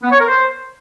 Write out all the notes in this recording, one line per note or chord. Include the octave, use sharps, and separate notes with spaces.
B3
C#5
A#4
C5